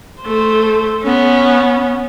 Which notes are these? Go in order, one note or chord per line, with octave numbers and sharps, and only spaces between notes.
A3 C5
B3 C#4